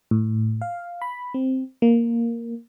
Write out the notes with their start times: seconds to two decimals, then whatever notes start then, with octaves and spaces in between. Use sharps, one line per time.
0.11 A2
0.62 F5
1.02 B5
1.34 C4
1.82 A#3